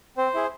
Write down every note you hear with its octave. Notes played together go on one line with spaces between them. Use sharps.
C4 C5
E4 G#4